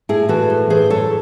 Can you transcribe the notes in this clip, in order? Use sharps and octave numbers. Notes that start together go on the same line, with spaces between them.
A2 E4 G#4
E3 F#4 A4
A2
E3 G#4 C5
F#2 A4 C#5